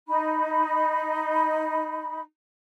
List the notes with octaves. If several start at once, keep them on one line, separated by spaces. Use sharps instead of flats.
D#4 B5